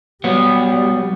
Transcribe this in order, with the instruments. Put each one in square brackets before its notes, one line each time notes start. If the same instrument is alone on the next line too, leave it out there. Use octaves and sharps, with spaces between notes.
[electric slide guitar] F#3 B3 F#4 [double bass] G3